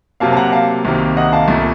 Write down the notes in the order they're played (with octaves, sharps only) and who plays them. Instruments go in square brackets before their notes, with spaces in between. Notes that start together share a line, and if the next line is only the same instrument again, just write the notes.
[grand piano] C3 F#3 A#3 [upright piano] F5 A5
[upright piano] A5
F#5 A#5
F5 A5
[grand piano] C2 C3 D#3 A#3
[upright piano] D#5 F#5
F5 A5
[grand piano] C2 A#2 A3